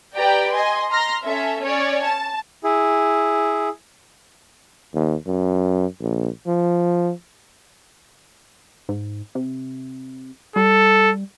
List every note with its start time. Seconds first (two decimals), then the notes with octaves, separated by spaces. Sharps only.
0.16 G4 B4 D5 G5 A#5
0.51 D#5 G#5 C6
0.91 A#5 C6 F6 A#6
1.24 C#4 A4 E5
1.62 C#4 C#5 D5
2.03 A5
2.64 E4 G#4
4.94 D#2
5.26 F#2
6.01 A#1
6.46 F3
8.89 G#2
9.35 C3
10.56 G3 A4